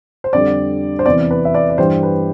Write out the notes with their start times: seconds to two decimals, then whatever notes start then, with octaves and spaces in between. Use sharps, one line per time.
0.24 C5
0.33 F2 D3 G3 D5
0.99 C5
1.06 E2 C3 E3 D5
1.31 B4
1.45 E5
1.54 D5
1.70 D5
1.78 G2 E3 G3 C5
2.03 B4